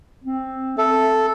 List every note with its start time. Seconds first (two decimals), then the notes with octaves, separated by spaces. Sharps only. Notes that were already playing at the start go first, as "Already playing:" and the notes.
0.24 C4
0.78 A4 E5